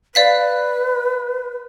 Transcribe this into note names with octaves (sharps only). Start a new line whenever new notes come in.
B4 D5 F5 B6